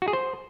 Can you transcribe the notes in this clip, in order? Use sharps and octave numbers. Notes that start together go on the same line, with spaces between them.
F#4
G#4
C5